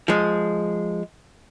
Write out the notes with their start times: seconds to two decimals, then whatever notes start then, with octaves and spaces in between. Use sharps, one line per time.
0.08 F3 G#3